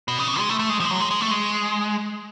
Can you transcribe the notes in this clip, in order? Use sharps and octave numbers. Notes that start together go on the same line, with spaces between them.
B2
C#3
B2
G#3
A3
A3
G#3
F3
G#3
F#3
G#3
G#3
A3
G#3